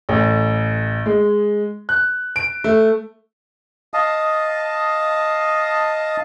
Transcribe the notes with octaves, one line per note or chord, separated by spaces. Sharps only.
A1
G#3
F#6
D7
A3
D#5 F5 A5 D#6